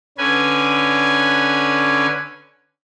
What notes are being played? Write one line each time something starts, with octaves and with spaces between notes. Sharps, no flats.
D3 C#4 B4 G#5